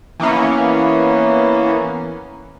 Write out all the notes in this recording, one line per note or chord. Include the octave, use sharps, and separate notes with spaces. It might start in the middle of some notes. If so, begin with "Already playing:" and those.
E3 A#3 B3 C#4